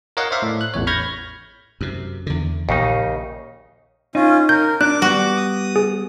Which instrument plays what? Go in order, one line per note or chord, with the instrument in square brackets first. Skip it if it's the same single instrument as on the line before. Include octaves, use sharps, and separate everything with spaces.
[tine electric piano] A#4 C#5 D#5 F5 F#5
C5 D5 E5 F5
A2
F#6
A1 E2 C#5
B5 C#6 F6 G6 G#6 A#6
[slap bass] F#2 C3
E2 D3
[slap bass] A#1 [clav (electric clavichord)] D#2 C#3 D#4
[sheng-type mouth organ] C#4 F4 [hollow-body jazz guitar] D#4
[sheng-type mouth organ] A#4 [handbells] G6
[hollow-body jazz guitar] D4 [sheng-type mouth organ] D6 [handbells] F#6
[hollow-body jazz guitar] G3 B3 [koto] F#4
[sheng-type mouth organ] D#6
[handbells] G#4